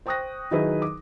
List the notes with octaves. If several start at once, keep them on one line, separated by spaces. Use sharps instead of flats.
C5 G5 C#6 D#6 F#6 A#6
D#3 F#3 D#4 E4 G#4 B4
D6